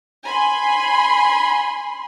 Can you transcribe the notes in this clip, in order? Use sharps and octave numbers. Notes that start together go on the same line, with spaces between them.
G#5 B5 C6